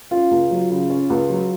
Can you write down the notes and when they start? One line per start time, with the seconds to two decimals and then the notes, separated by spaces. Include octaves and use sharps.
0.11 C#4 F4
0.31 C#2
0.51 F#3
0.70 C#3
0.90 C#4
1.10 C#2
1.30 F#3